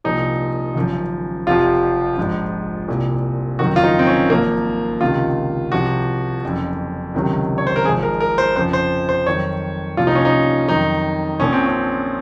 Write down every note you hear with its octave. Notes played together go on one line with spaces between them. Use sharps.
C2 A#2 F3 D#4
G#1 F#2 C#3 F3
F1 F2 C3 F3 F4
A#1 G#2 F3
C2 A#2 F3
F#1 F2 D#3 F#3 F#4
F4
D#4
C4
C#4
G#1 F#2 F3 A#3
C#2 C3 D#3 F4
C2 C3 F3 F#4
F#1 F2 C#3
C#2 C3 D#3 F#3
C#5
C5
A#4
G#1 G#2 F3 G#4
A#4
A#4
C5
F2 C#3 F3 C5
C5
C5
F2 D#3 F#3 C#5
C2 A#2 F3 F4
D#4
C#4
D#4
F2 D#3 F#3 D#4
A#1 A#2 F3 C#4
C4
C#4